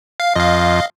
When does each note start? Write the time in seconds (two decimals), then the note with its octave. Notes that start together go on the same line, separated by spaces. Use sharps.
0.20 F5
0.36 F2 D#5 F5